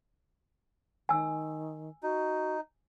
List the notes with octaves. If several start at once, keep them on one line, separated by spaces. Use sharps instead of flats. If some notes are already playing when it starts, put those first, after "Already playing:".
D#3 G#5 E6
D#4 F#4